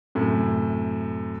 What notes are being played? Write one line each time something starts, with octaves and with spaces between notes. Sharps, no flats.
F#2 A2 C3